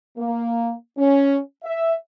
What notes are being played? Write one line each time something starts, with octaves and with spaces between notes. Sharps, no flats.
A#3
C#4
E5